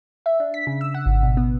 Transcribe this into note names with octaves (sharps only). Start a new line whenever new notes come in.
E5
D4
B6
C#3
E6
F#5
G#1
B2
B3